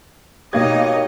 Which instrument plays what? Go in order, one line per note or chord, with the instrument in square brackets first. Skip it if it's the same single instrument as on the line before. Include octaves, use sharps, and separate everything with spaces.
[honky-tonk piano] B2 A#3 G#6 [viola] D#4 D#5 [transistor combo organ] G4 C#5